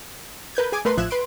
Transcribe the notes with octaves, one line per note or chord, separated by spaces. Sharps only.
A#4 B4 G6 G#6
G#4 G#5 D6 G#6
A3 A#4 B4 C6
A1 F3 E5 F#6 G#6 E7
B4 C6 D7